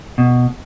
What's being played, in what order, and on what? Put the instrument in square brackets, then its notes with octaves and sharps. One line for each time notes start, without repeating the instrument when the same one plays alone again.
[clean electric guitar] B2